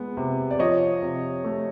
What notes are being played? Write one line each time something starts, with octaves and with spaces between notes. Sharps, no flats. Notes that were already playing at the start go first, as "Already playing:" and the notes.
Already playing: G#3 B3
C3
D5
F3 C#5 D#5
C3
A3